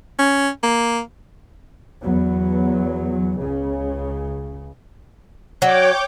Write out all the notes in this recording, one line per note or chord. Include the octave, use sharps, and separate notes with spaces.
C#4
A#3
E2 F#3 B3
C#2 C#3
F#3 C#5 G5 D6